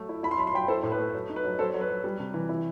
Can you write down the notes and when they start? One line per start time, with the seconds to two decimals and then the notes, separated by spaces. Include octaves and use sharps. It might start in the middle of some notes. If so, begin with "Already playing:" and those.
Already playing: F#3 A3
0.09 E4
0.23 E4 B5
0.31 C6
0.38 F#3 B5
0.47 C6
0.53 F#3 G5 B5
0.68 E4 A4 C5
0.83 A2
0.92 B4
0.99 A3
1.14 F#3
1.29 D#4
1.36 B4
1.44 F#3
1.59 F#3 A4 C5
1.74 F#3
1.81 B4
1.90 F#3
2.04 G3
2.19 C3
2.34 E3
2.49 E4